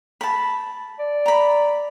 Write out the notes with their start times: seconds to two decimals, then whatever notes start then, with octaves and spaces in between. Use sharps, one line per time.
0.21 A5 B5
0.99 D5
1.26 A#5 B5